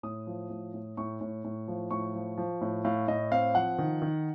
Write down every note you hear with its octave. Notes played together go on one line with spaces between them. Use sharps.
A2 D#6
F3
A2
A2
A2 C#6
A2
A2
F3
A2 C#6
F3
F3
A2
A2 F5
A2 D#5
C4 F5
F3 F#5
D#3
D#3